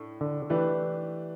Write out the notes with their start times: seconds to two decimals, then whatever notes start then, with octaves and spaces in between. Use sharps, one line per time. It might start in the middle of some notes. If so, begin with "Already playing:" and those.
Already playing: A2 A3 D4
0.21 D3
0.50 E3 A3 D4 G4 B4